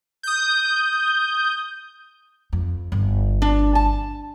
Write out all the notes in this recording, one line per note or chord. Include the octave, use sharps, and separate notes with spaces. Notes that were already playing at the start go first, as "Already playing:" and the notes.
D#6 G6
F2
G1
D4
A5